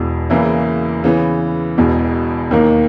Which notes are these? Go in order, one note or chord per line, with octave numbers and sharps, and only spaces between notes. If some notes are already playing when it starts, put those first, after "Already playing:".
Already playing: E1 E2 B2
E2 C#3 E3 A#3 E4
C#3 E3 B3
E1 E2 B2
D#2 D#3 A#3